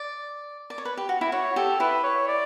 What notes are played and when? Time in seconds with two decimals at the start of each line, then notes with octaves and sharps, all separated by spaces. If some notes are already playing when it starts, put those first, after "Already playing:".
Already playing: D5
0.70 D5
0.78 C#5
0.85 B4
0.97 G4
1.09 F#4
1.21 E4
1.32 F#4 C#5
1.56 G4 A4
1.80 E4 B4
2.04 C#5
2.28 D5